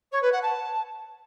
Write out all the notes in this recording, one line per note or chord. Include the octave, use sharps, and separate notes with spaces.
C#5
B4
F#5
A5